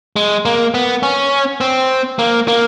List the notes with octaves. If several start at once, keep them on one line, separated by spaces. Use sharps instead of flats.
G#3
A#3
B3
C#4
C4
A#3
A#3